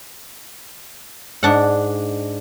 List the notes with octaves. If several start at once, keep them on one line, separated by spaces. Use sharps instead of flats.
G#2 D4 F#5